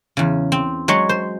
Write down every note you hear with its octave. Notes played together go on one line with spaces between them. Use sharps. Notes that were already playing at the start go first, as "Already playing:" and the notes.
E2 C#3
C4
F#3 G#3 C#5
C5